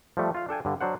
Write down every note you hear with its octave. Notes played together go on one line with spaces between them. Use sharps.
F3 G3 A3
F4 F5
D4 A4 G5 G#5
G2 D3
F#3 D4 C5 F#5